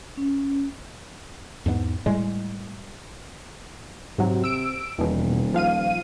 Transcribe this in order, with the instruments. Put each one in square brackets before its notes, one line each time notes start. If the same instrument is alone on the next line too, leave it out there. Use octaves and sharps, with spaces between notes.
[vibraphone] C#4
[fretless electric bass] E2 G#2 G3 B3
A2 G3 G#3
[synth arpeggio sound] G#2 F#3 [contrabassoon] C3
[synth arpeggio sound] E6 D7
[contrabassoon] D#1 [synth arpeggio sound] E2 B2
[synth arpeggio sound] F3 F5 D#7